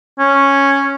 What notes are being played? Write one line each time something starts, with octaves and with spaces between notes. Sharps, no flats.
C#4